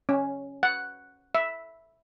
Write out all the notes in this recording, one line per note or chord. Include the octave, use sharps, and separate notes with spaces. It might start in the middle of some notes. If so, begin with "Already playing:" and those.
C#4
F#5
E5